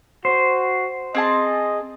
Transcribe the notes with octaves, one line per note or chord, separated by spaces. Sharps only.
F#4 C5
C4 G#4 D#5 A5